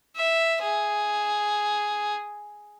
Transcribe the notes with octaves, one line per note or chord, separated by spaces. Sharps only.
E5
G#4